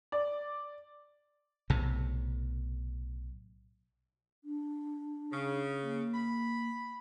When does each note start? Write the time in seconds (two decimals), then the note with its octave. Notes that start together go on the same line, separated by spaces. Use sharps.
0.12 D5
1.70 B1 A2 C3
4.44 D4
5.32 C#3
5.82 A#3
6.14 B5